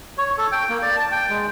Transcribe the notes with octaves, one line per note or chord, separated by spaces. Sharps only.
C#5
A4
G5
A#3
D5
A5
G5
G#3